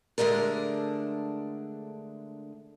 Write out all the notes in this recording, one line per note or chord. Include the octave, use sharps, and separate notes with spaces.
D3 G#3 A3 D4 A#4